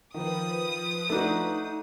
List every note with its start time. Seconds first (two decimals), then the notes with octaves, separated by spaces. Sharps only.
0.14 D#3 F3 B4 D#6
1.10 A3 D4 D#4 F#4